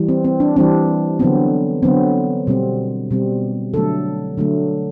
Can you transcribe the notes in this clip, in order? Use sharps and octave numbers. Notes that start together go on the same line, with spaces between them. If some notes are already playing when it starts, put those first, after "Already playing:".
Already playing: E3 G3
C4
C4
D4
E3 G3 C4 D4
D3 F#3 B3 C4
D3 F#3 B3 C4
B2 G3 C4
B2 G3 C4
D3 F#3 A3 A4
D3 F#3 A3